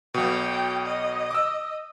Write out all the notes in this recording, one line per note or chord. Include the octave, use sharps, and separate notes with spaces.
B1 B2 G5
D#5
D6 E6